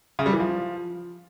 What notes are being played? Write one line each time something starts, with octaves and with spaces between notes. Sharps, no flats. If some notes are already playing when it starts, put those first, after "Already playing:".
C#3
G3
E3
F3